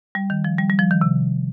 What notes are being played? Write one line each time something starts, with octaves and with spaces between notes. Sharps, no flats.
G3
D#3
F3
G3
G3
F3
D#3
C3